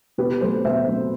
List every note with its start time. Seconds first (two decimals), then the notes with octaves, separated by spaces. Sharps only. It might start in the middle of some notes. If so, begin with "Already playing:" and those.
0.18 B2 G4 B4
0.41 F#3 A3 C4 A4 C5
0.65 B2 C5 E5
0.87 F#3 A3 C4